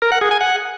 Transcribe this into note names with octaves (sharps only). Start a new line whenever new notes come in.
A#4
F#5
G#4
G#5
F#5